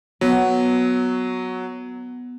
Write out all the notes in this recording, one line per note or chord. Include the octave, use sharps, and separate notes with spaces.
F#3 B3